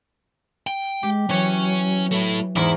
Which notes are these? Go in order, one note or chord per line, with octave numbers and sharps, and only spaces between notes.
G5
G#3 G4
E3 F#3 C#4 C#5
A3 E4
E2 G#2 E4 A#4